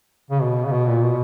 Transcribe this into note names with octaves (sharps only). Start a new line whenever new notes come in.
C#3
B2
C#3
B2
A#2
B2